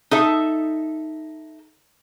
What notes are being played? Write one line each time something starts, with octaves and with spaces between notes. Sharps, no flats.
D#4 A4 E5